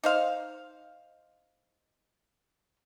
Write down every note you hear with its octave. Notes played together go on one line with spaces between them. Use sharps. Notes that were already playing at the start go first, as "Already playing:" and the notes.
D#4 C5 F5